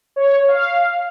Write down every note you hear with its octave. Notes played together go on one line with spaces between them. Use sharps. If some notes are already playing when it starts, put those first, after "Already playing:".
C#5
F5